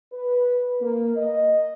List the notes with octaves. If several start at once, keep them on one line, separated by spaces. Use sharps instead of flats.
B4
A#3
D#5